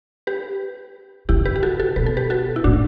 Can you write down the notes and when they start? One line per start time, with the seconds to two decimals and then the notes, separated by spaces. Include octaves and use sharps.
0.27 G4 B4
1.29 C#3 E4 G4
1.45 G4 B4
1.56 G4
1.63 F#4 A4
1.80 F#4 A4
1.96 B2 B4
2.06 A4
2.17 G4 B4
2.30 F#4 A4
2.56 E4
2.64 A2 D4 F#4